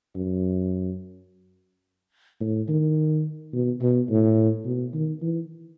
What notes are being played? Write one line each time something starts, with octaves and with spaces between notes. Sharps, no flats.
F#2
A2
D#3
B2
B2
A2
B2
D#3
E3